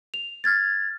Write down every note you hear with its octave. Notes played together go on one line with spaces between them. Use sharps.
F7
F6 G#6 A6